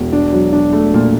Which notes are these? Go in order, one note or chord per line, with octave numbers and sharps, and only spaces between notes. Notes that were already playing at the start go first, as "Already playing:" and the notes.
Already playing: E1
D4
F#3
D4
A3
A#2